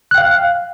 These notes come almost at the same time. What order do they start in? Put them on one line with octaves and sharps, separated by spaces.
F#6 G5 F5